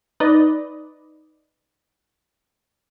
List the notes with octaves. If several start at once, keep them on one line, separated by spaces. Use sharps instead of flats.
D#4 B4 D5 D#5